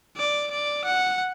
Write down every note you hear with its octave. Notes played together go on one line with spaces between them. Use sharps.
D5
D5
F#5